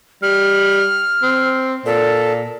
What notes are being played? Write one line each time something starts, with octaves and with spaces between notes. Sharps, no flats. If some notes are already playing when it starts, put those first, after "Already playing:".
G3 F6
C4
A#2 A4